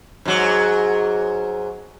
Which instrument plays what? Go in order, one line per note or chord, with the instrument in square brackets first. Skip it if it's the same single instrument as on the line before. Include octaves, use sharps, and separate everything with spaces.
[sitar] G#2 F#3